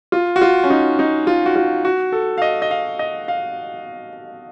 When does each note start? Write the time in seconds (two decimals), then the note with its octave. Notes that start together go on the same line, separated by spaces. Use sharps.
0.12 F4
0.36 F#4
0.41 F4
0.64 C#4
0.70 D#4
0.99 D#4
1.27 F4
1.46 F#4
1.56 F4
1.85 F#4
2.12 A4
2.38 F5
2.42 D#5
2.62 D#5
2.71 F5
2.99 D#5
3.28 F5